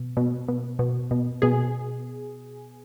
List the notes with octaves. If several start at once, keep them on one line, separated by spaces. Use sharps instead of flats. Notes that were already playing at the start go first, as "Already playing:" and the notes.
Already playing: B2
B2
B2
B2
B2
B2 G#4